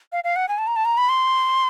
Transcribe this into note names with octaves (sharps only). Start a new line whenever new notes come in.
F5
F5
F#5
G#5
A5
A#5
A5
A#5
B5
C6